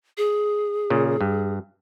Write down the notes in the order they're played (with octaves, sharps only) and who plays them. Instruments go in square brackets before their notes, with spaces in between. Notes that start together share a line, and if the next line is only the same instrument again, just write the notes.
[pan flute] G#4
[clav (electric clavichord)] A#2 C#3
G2